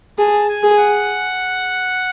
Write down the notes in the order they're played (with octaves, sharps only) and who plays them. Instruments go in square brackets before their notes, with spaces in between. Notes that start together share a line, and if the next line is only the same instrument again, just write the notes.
[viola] G#4 [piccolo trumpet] A5
[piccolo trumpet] G#5
[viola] G#4
[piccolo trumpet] F#5